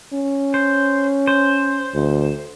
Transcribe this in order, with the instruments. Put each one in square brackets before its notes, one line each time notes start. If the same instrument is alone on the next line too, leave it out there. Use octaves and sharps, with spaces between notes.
[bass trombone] C#4
[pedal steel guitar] C5
C5
[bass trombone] D2